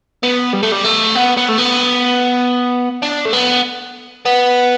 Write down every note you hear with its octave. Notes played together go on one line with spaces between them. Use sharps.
B3
G3
A3
G3
A3
B3
B3
A3
B3
D4
A3
B3
B3